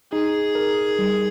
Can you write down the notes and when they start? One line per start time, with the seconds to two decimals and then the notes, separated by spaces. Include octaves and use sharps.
0.12 D#4 G#4
0.55 A#4
0.99 G3